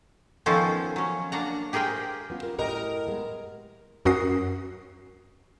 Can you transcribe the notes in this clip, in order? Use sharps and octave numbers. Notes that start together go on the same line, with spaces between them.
D#3 F3 B3 C#4 A4 C5
F#3 C#4
A#3 D4 F#5 A#5
G4 G#4 A#4 C5 G5
B3 C#4 F4
A#4
A2 G4 A#4 D#5
G#3 B3
F#2 C#4 F#4 A#4 D#6 C7